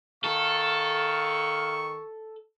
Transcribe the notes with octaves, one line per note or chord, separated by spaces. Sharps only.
D#3 A4 F5 C#6